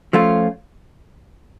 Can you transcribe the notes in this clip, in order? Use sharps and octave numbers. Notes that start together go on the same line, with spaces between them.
F3 A3 C#4 F4